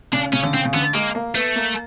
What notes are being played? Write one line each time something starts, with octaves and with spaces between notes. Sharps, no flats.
C#3 D4
C#3 C#4
D3
C#3 C4
C#3
D3 B3
G#3 A#3
A#3
A3 B3
A#3